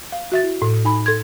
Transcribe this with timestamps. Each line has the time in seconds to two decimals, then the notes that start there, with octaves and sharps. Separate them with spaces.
0.12 F5
0.32 F#4 E5 A6
0.43 E4
0.62 A2
0.85 D#4 G#5 B5
1.06 A4 C6 G#6